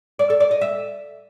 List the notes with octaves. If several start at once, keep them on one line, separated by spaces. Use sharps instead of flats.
D5
A4
D5
D#5
E5